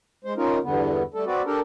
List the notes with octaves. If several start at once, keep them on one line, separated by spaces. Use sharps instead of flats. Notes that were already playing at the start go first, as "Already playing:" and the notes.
G#3 C5
C#4 D#4 F4 A#4
E2 G2 D3 B3
G3 A3 A4
C4 F#4 B4 D5
D4 G4 A4 A#4